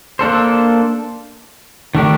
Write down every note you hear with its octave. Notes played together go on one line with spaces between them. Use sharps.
A#3 D4 A4 C5
D#3 A3 D4 G4